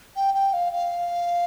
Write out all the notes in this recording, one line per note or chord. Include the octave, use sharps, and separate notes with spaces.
G5
G5
F5
F5